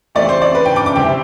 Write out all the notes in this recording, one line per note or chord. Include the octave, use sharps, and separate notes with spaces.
E3 A3 C4 G4 D5
C5
D5
B4
G5
D6
D6
D2 C3 G3 C4 E4 G5